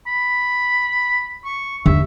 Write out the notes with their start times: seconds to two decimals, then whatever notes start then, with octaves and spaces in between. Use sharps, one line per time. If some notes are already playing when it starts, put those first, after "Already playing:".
0.07 B5
1.45 C#6
1.86 D#2 D3 E5